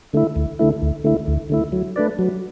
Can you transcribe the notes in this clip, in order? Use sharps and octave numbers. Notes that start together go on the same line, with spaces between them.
D3 A3 E4
D2
D3 A3 E4
D2
D3 A3 E4
D2
D3 A3 E4
F#3
A3 D4 B4 D5
F#3